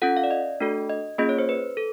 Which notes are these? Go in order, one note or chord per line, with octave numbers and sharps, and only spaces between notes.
C#4 F4 A4 F#5
F5
D5
D#5
A3 D4 F#4 A4
D#5
A#3 C#4 F4 G#4 D#5
C#5
C5
B4
A4